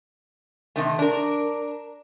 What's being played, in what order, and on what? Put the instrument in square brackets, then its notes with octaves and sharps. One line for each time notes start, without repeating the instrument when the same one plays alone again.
[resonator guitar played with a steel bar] C3 D#3 A3
D4 A#4